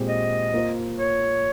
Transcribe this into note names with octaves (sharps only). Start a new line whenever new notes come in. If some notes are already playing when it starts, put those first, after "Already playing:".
Already playing: A#2 G#3 C4 G4
D#5
A#3 F4 C5
C#5